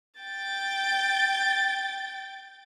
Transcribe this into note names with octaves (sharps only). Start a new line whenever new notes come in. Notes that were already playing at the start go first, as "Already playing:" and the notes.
G5 A6